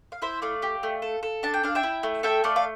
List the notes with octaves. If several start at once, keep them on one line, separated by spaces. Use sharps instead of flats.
F5
E4 C5 E5
A3 D5 F5
G4
A3
A4
A4
D4 A5
G5
D4 F5
E5 G5
E4
A3
A4 E5 G5
A3 D5 F5
F5